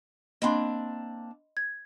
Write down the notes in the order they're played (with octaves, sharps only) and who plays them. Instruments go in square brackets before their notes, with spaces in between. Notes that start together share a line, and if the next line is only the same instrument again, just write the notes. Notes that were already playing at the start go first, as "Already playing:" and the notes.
[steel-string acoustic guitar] A#3 C4 D4 [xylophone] D#5 B5 C6
[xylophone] G#6